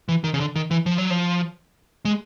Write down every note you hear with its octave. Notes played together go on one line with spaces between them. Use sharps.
E3
D#3
C#3
D3
D#3
E3
F3
F#3
F3
G#3